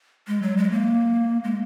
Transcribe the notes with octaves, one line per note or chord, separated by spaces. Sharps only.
G#3
F#3
G#3
A#3
G#3